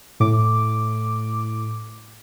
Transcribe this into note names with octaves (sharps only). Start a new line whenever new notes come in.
A2 D6